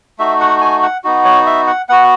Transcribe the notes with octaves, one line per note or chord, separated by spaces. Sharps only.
A3 D#4 F#4 E5
F#5
G#5
F#5
B3 D#4 F#4
C#5
E5
F#5
B3 F#4 F#5